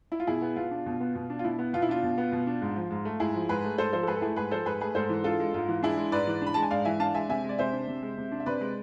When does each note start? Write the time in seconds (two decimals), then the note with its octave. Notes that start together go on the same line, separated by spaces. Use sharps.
0.12 E4
0.20 F4
0.27 B2 E4 G#4
0.42 B3
0.56 B2 F4
0.71 D4
0.86 B2
1.00 B3
1.15 B2
1.30 D4
1.39 F4
1.44 B2 E4
1.59 B3
1.73 B2 F4
1.82 E4
1.89 D4 F4
2.03 B2
2.18 B3
2.32 B2
2.47 D4
2.62 G#2
2.76 F3
2.90 G#2
3.05 A3
3.20 G#2 E4 G#4
3.34 F3
3.49 G#2 G#4 B4
3.64 A3
3.78 G#2 A4 C5
3.93 F3 A4 C5
4.03 A4
4.07 G#2 G#4 B4
4.16 A4
4.22 A3 E4 G#4
4.36 G#2 G#4 B4
4.51 F3 A4 C5
4.66 G#2 G#4 B4
4.81 A3 G#4 B4
4.95 G#2 A4 C5
5.09 E3
5.24 D4 F4 A4
5.40 G#3
5.54 G#2 F4
5.69 E3
5.83 D4 E4 G#4
5.97 G#3
6.12 G#2 B4 D5
6.27 E3
6.41 D4
6.47 B5
6.54 G#3 A5
6.62 G#5
6.71 G#2 D5 F5
6.85 E3 E5 G#5
7.00 D4 F5 A5
7.14 G#3 E5 G#5
7.29 C3 E5 G#5
7.44 G#3
7.49 D5
7.59 C3 C5 E5
7.73 D4
7.88 C3
8.02 G#3
8.18 C3
8.32 D4
8.40 E5
8.46 C3 B4 D5
8.61 G#3